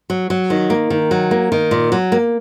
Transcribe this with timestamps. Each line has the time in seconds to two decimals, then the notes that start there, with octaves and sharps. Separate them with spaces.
0.10 F#3
0.30 F#3
0.50 D#3
0.70 A#3
0.90 D#3
1.11 F#3
1.31 A#3
1.52 D#3
1.71 A#2
1.92 F#3
2.12 A#3